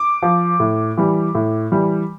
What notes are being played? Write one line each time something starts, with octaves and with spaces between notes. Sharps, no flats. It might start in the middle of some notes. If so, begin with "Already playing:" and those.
Already playing: D6
F3
A2
E3 G3
A2
E3 G3